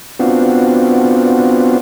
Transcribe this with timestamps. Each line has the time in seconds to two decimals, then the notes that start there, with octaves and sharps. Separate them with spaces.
0.19 B3 C4 D4 F4 F#4